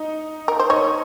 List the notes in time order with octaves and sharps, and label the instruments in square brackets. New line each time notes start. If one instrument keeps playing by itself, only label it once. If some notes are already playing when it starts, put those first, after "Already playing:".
Already playing: [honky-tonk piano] D#4
[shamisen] A#4
C5
[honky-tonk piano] D#4 [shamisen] C#5